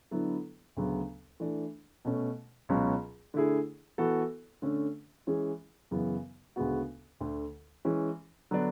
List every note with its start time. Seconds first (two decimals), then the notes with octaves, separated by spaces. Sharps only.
0.11 D3 F#3 B3 E4 A4
0.77 D2 C#3 F#3 B3
1.40 E3 A3 D4
2.05 B2 A3 C#4
2.69 C#2 B2 F#3 C#4
3.34 D3 A3 E4 G#4
3.98 E3 B3 F#4 A4
4.62 D3 A3 C#4
5.27 E3 G#3 C#4 G#4
5.91 F#2 C#3 E3 B3
6.56 D2 C#3 G#3 B3 F#4
7.20 D2 D3 A3
7.85 E3 G#3 C#4
8.51 D3 F#3 B3 D4